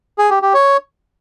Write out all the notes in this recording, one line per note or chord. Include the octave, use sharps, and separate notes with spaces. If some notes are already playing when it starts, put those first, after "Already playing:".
G#4
G4
G4
C#5